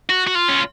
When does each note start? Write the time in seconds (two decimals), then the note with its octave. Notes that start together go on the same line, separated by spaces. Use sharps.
0.09 F#4
0.27 F#4
0.35 F4
0.48 C#4